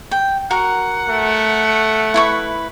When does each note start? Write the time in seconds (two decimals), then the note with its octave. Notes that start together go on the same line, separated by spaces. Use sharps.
0.11 G5
0.51 F#4 A#4 F#5
1.09 A3
2.14 E4 B4 C#6